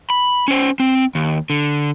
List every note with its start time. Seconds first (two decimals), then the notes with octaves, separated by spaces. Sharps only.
0.10 B5
0.48 C#4 C5
0.80 C4
1.15 D#2
1.50 D3